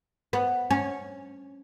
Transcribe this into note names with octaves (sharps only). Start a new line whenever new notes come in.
B3
C#4